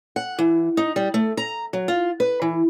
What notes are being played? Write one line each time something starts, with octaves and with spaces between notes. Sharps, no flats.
F#5
E3
D#4
G3
A3
A#5
F#3
F4
B4
E3